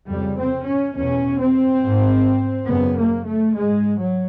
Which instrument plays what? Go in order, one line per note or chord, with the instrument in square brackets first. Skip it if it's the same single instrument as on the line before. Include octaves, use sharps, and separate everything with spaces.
[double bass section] F2 C#3 G3
C4
C#4
E2 B2 C#4
C4
G#2
F#2 C#3 B3
A#3
A3
G#2 G#3
F#3